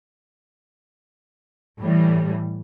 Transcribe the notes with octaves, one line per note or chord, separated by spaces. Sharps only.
A2 E3 G3